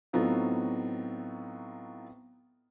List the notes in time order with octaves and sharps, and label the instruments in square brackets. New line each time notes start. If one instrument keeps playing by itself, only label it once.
[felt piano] A2 F#3 B3 C4 D#4 F4